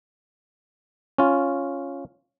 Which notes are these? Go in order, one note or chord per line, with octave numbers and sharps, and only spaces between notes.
C#4 F4